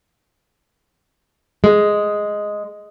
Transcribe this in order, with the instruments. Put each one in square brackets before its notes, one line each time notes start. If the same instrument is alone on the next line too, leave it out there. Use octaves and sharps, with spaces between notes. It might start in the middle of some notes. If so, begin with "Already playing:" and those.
[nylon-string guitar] G#3